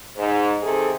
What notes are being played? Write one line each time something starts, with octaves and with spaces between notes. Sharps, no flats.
G#2
C3 D#3 G#4 A4